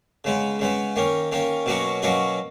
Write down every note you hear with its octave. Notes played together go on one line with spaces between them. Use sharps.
C#3 G#3 B3
C#3 G#3 B3
D#3 A#3 C#4
D#3 A#3 C#4
B2 F#3 A#3 C#4 F#4
B2 F#3 A#3 C#4 F#4